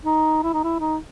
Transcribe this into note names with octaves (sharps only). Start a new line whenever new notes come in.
D#4
E4
D#4
E4
D#4